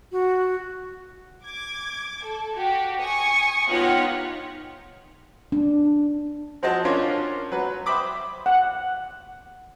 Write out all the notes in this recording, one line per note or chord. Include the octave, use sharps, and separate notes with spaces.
F#4
D6 G#6
A4
F#4 G4
G#5 C#6 D#6
B3 D#4 F4 G4 C#5 F#5
D4
F3 C4 F#4 D#5 A5 C6
C#4 D4 F4 A#4 C5 C#5
F#3 B4
C5 E5 G5 B5 D6 D#6
F#5